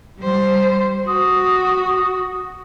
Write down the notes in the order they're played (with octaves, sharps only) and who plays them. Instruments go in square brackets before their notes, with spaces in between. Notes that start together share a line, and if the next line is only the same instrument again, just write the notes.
[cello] G3 C5
[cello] F#4 [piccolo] D#6